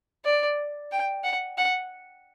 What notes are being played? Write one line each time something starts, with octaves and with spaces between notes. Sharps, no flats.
D5
G5
F#5
F#5